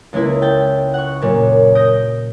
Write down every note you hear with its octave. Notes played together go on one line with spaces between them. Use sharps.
C#2 G#3 A#3 E4
G5 A6
F#5 C#6
F#2 A#2
D#6 G6 A#6 D7